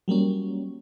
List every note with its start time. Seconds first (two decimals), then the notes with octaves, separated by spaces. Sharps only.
0.08 F#3 G3 A#3 C#4